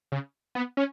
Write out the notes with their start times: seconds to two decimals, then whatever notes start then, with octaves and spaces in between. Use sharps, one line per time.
0.12 C#3
0.55 B3
0.77 C#4